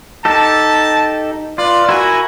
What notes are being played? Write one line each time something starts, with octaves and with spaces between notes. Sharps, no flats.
D#4 G4 A4 A5
F4 B4 D5
E4 F#4 A#4 G#5